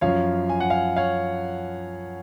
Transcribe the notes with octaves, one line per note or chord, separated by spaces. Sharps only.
F#2 F3 C#5 F5
G#5
F#5
F5 G#5
C#5 F5